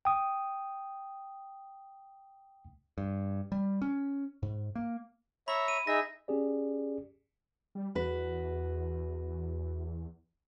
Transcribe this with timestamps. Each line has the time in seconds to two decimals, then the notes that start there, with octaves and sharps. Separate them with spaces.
0.05 G5 D#6
2.98 G2
3.52 G3
3.82 C#4
4.43 G#2
4.75 A#3
5.48 C#5 E5 A#5 B5
5.68 D#7
5.87 D#4 G#4 E5 A#6
6.28 C#4 G4 G#4 D5
7.75 G3
7.95 E2 F#4 B4